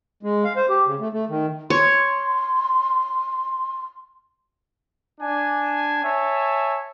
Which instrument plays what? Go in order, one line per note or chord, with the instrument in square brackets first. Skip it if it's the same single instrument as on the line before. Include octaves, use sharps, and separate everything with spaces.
[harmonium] G#3
F5
C5
G4
C#3
A3
A3
D#3
[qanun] C#5 [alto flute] C6
[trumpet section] D4 G#5
C#5 E5 G#5 A5